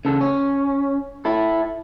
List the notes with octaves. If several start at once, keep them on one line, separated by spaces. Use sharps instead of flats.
C#3 A4
C#4
E4 A4